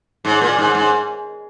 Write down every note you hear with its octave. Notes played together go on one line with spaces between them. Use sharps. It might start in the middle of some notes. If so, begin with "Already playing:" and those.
G#2
A#2
G#2
G#2